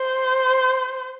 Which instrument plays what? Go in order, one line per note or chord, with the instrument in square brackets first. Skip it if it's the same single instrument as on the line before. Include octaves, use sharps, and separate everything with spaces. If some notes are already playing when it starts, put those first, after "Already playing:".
Already playing: [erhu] C5